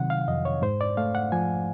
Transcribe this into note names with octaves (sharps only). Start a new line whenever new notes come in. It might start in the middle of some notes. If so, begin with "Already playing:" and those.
Already playing: C3 D#3 F#3 F#5
F5
F2 D#5
C#5
G#2 C5
D5
A3 F5
F#5
F3 G#5